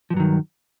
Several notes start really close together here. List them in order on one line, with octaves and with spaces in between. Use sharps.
F3 G2 F#3 D#3